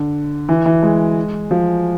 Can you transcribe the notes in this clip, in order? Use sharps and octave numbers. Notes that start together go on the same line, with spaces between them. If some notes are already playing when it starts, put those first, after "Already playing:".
Already playing: D3
E3
E3
G#3
F3